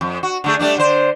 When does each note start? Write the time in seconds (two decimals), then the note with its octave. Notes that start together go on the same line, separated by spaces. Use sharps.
0.01 F2
0.23 F#4
0.44 D3 A3 G#4
0.59 G3 A3 D4
0.77 D3 C5